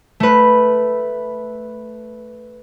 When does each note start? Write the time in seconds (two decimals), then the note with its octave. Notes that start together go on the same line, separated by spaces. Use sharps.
0.20 A3 B4